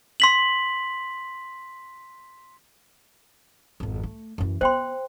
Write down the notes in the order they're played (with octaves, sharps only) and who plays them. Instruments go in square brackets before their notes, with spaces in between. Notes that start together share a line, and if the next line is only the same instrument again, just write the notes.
[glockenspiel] C6 B6 F#7
[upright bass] G#1 F2
A3
F#2 E3
[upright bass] B3 [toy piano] C5 G5 C6